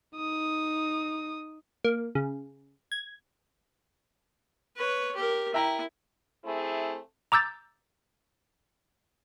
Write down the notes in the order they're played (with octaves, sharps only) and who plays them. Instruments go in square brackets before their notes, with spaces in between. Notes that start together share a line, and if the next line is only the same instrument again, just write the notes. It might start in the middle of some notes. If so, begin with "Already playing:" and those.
[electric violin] D#4 D#6
[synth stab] A#3
C#3
G#6
[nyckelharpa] B4 C#5
G4 A#4
[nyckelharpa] E4 [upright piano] E5 G5 A#5
[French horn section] A3 C4 E4 G#4
[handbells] A#5 D6 E6 G6 A6